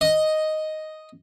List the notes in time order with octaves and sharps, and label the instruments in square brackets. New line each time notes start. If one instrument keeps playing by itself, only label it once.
[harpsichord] D#5